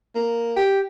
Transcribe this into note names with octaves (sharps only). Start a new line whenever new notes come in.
A#3
G4